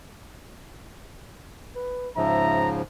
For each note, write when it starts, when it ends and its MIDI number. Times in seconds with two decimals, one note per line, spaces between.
1.75 2.09 71
2.17 2.82 44
2.17 2.82 49
2.17 2.82 53
2.17 2.61 76
2.17 2.72 82